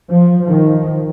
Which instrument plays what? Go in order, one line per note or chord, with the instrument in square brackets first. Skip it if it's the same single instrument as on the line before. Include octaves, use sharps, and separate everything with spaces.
[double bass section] F3
D#3 F3